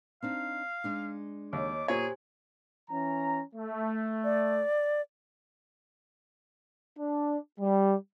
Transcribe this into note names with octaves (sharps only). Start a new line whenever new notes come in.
C4 D4 D#4 F5
G#3 D4 D#4
D#2 C#5 D#5 D6
A#2 G4 G#4 C5 C#5 G#5
E3 C#4 A#5
A3
D5
D4
G3